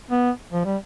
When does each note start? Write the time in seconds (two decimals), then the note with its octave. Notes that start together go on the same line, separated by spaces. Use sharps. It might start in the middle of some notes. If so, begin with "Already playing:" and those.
0.11 B3
0.53 F3
0.65 G3